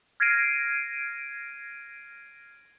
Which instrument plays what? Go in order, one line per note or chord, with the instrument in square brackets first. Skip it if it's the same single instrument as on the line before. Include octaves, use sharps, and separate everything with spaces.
[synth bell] F6 G#6 A#6 C7 D7 D#7